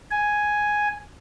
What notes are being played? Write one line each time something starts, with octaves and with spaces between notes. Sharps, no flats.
G#5